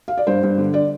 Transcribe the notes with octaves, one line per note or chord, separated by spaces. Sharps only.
F5
D5
G2 C5
G2
D3
D5